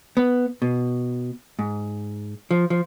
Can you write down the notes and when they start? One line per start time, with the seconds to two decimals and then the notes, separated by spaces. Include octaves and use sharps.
0.17 B3
0.62 B2
1.59 G#2
2.51 F3
2.70 F3